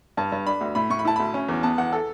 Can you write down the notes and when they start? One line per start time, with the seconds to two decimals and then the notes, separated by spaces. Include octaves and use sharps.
0.17 G2 A5
0.32 G2
0.46 D4 B5
0.61 D2
0.75 A2 B5
0.90 A2 C#6
0.99 B5
1.05 E4 A5
1.16 D2 B5
1.34 C#4
1.49 E2
1.63 B3 A5
1.78 E2 F#5
1.93 A4